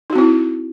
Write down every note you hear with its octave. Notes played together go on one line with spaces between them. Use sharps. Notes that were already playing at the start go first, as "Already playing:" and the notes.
C4 D#4 E4 F#4